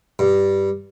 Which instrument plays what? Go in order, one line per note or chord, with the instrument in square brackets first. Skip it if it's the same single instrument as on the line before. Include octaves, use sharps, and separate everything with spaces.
[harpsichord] G2